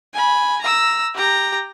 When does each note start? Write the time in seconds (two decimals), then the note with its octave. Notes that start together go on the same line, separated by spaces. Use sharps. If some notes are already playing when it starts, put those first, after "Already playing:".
0.14 G#5 B5
0.61 A#5 E6
1.15 G4 A#5